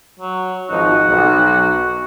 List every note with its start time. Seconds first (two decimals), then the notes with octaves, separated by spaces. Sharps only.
0.19 F#3
0.70 G#1 F3 D#4 F#4
1.07 B1